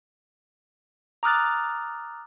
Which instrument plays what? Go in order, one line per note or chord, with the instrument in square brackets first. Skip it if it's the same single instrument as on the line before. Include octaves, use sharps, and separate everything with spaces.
[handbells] A#5 D6 D#6 F6 F#6 A6